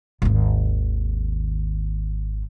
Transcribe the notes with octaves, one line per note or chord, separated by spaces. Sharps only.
G#1 D#2